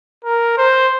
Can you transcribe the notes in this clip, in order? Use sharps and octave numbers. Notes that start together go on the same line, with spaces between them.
A#4
C5